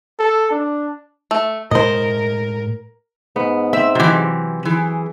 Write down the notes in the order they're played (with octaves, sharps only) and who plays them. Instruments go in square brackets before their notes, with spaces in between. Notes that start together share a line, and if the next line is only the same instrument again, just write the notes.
[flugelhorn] A4
D4
[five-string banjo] A3
[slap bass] A2 G#3 [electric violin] A#4 [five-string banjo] C5 D#5
[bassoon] G#2 [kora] B3
[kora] C4 [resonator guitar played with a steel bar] E5
[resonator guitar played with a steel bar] C3 E3 [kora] F#3 G4
[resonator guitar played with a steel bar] E3 [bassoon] G#4